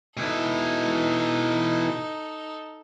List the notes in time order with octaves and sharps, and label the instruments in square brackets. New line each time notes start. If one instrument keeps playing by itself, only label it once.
[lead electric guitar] B2 E4 [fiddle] D#4 A4